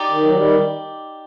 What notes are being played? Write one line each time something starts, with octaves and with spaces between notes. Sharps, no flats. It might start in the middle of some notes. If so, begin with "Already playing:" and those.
Already playing: D#4 G4 D5
D#3
F#3
D#3 G3